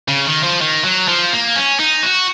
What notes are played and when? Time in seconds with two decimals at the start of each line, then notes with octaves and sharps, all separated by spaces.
0.08 C#3
0.26 D#3
0.43 F3
0.61 D#3
0.85 F#3
1.08 F3
1.33 A#3
1.56 C#4
1.79 D#4
2.03 F#4